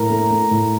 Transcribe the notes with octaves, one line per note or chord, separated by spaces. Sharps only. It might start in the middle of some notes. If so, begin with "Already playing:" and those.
Already playing: A2 A#4 A#5
A3
A3
A2